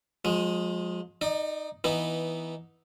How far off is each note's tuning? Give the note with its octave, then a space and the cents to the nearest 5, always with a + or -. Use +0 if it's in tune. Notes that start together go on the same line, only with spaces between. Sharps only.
F3 +40 G#3 +0
D#4 +0 D5 +35
E3 -10 B3 +0 D#4 +0